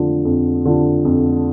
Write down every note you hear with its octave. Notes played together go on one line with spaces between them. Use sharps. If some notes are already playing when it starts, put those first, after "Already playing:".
Already playing: F2 D3 F3
F2
D3 F3
F2